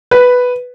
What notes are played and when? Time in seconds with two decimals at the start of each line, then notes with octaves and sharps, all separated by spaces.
0.11 B4